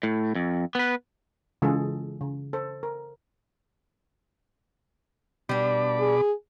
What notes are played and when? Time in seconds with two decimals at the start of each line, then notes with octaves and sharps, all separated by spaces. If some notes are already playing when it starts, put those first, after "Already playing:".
0.03 A2
0.35 F2
0.75 B3 B4
1.62 C#3 E3 G#3 F4 G#4 A4
2.21 C#3
2.53 A4 C5
2.83 A#4
5.49 B2 G3 D4 B5 D6
6.00 G#4